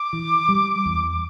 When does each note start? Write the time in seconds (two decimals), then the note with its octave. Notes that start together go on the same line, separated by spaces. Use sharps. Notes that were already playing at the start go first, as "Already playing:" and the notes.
Already playing: D6
0.13 E3
0.48 G3
0.85 E2